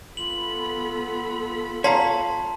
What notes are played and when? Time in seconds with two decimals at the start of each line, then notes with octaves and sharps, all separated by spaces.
0.17 B3 F4 A4 B5 F#7
1.84 C#5 F5 A5 A#5 C6 B6